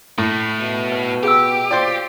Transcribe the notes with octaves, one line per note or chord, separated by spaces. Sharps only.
A2 A3 E4
B2
B4
G4 G#4 G5 E6
F4 C5 D5